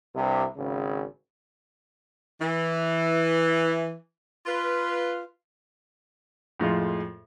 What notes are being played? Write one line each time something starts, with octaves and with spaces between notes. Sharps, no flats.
C2 G2 C3
G#1 C#3
E3
F4 B4
F2 A2 G#3 F4